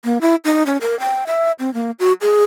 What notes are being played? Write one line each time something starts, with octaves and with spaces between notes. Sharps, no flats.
A#3
E4
D#4
C#4
A#4
G5
E5
C4
A#3
F#4
G#4